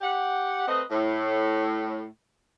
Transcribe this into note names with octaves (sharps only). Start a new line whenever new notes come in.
G4 F#5
A3 C4 B4 D#5
A2